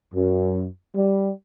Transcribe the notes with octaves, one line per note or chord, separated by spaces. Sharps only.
F#2
G3